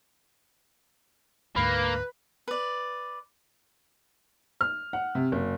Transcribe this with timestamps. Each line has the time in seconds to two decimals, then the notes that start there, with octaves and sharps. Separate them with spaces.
1.56 D2 G#2 D3 A#3 B4
2.48 B4 D5
4.61 F6
4.93 F#5
5.15 C3
5.32 F#1